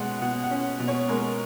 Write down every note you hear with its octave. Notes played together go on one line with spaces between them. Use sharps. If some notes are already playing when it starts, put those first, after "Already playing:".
Already playing: B2 G#3 C#4 F#5
B2 F#5
F#5
C#4
B2
C#5
G#3 A#4